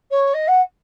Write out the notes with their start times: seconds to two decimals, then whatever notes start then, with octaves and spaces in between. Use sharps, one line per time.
0.10 C#5
0.33 D#5
0.47 F#5